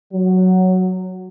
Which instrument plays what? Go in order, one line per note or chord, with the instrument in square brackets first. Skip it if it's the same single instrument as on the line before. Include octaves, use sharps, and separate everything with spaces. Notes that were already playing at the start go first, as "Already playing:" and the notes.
[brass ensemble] F#3